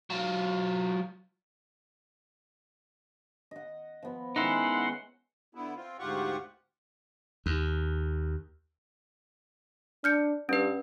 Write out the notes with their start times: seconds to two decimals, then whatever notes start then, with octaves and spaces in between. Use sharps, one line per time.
0.10 F#3 F4
3.51 D#5 F#5
4.03 F3 B3
4.36 D#3 G#3 C#4 D#4 E4 F#5 C6
5.55 D3 B3 E4
5.76 C4 F4
5.99 D2 G#2 F4 G4 F#5 C#6
7.46 D#2
10.04 D4 F6 G6 C#7
10.49 G2 C#4 B4